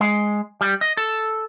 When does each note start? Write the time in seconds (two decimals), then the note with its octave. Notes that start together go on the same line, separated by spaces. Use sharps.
0.01 G#3
0.61 G3
0.81 D#5
0.97 A4